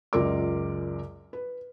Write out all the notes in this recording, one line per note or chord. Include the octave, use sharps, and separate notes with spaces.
C#2 F#2 F4 A#4 D5 D6
B4